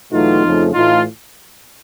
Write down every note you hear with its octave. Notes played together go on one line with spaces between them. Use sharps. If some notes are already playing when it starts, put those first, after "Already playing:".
E2 B2 F#3 A3 D#4 F4
F2 C#3 F3 A3
A2 E3 A3 D#4 F4